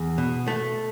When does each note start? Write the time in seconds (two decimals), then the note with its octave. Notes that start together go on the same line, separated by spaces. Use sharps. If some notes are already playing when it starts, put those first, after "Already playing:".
Already playing: E2
0.18 B2
0.48 A3